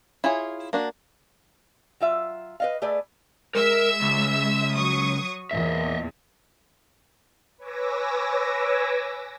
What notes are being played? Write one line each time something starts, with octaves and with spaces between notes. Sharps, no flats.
E4 F4 G#4 C#5
A#3 D4 F#4
F#3 F4 E5
B4 D#5 F5
A3 G#4 B4 D5
G#3 A#4 E5 E6
C#2
F#3 C#6 D#6
E2 A#2 D#5 E5
B4 C#5 G#5 D6 E6 A#6